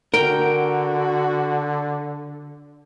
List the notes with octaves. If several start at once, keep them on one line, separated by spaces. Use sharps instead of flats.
D3 F#4 A#4 G5